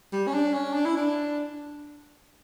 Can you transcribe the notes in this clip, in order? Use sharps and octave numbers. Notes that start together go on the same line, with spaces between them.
G3
C#4
D4
C#4
D4
E4
D4